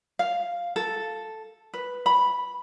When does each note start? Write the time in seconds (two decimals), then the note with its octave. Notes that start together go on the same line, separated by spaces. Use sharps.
0.19 F5
0.76 A4
1.74 B4
2.06 B5